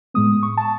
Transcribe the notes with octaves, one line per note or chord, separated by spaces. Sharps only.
A2 G#3 B3 D#6
C#6
A5